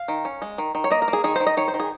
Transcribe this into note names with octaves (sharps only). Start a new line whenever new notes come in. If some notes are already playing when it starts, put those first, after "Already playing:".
Already playing: F5
D#3
C#4
G#3
D#3
D#3
C#5
A#3 D#5
A#4
A#3
G#4
D#3 G#4
C5
D#3
D#5
D#3 C#5
C5
D#3
G#4